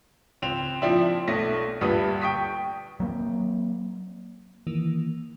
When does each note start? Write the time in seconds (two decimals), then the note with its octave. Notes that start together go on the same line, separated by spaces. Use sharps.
0.42 C#2 C4 F7
0.82 A#2 F3 C4 D4 E4
1.28 B1 A3 A#6
1.81 D2 G2 A#2 G3 B4 D#6
2.21 G5 C#6 D#6 B6
3.00 F#3 A#3 C4
4.67 D#3 E3 A#3